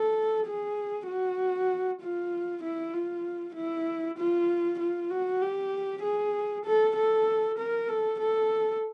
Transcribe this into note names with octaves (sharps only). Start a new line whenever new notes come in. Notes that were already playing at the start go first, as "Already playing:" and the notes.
Already playing: A4
G#4
F#4
F4
E4
F4
E4
F4
F4
F#4
G4
G#4
A4
A4
A#4
A4
A4